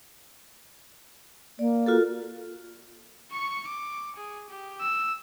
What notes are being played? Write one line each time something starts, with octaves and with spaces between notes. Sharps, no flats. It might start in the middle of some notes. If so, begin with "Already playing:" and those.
A#3 D5
F4 F#4 A4
C#6 C#7
D6
G#4
G4
E6